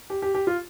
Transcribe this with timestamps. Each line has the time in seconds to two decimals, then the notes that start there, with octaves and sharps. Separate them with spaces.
0.10 G4
0.22 G4
0.34 G4
0.47 F4